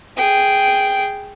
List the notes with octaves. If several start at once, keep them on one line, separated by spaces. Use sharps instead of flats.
G#4 G5